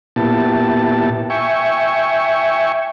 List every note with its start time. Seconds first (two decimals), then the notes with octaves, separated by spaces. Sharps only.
0.16 A#2 B3 E4 G4 A5
1.30 E5 G5 G#5 C#6